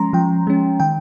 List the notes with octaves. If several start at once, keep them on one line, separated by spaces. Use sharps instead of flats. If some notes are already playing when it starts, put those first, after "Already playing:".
Already playing: F3 G#3 C#4 A#5 C6
F3 G5
G#3 C#4
D#3 G5